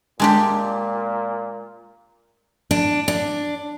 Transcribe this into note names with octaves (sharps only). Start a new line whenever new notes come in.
A#2 G#3 D4 G4
D4
D4